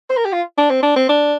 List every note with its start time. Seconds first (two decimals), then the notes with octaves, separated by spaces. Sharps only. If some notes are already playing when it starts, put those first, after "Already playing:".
0.10 C5
0.17 A#4
0.25 G4
0.32 F4
0.58 D4
0.70 C4
0.83 D4
0.96 C4
1.09 D4